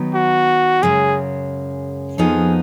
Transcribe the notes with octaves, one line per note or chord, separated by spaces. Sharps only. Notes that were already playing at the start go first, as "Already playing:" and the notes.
Already playing: D#3 F#3 B3 D#4
F#4
F#2 C#3 G#3 G#4
F2 F3 B3 D#4 G#4